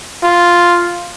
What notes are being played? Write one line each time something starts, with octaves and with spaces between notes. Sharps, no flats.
F4